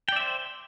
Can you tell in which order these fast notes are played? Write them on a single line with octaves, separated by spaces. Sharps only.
G5 D5 E5 C5